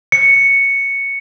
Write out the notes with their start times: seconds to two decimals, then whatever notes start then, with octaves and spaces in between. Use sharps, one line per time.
0.12 C#7